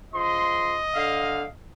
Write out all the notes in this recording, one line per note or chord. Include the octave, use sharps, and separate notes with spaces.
C#3 F3 D#5 C6
D3 F5